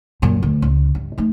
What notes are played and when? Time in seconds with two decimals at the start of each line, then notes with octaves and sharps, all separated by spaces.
0.22 F#2 A#2
0.43 D2
0.62 C#2
0.95 G2
1.18 A3 D#4